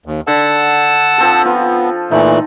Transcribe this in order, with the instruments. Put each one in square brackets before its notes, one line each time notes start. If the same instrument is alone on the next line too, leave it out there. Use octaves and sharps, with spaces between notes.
[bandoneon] D#2
[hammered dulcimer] D3 [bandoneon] F#5 A5 E6
[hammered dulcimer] F3 C4 A4
[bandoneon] B3 [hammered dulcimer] F4
[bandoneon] A#2 E3 A3 [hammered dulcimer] D#4